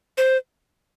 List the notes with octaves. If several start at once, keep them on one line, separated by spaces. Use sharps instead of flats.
C5